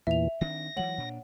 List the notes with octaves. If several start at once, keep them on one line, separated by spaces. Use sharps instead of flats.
E2 A#2 E3 E5 F7
D#3 C4 D4 A#6
E3 F#3 G#3 C#5 F#5 F#7
A#2 D4